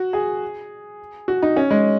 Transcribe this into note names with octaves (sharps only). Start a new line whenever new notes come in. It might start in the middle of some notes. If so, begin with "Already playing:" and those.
Already playing: F#4
G#4
F#4
D#4
C#4
G#3